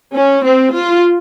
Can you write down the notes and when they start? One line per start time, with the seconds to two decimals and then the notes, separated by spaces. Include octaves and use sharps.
0.14 C#4
0.45 C4
0.73 F4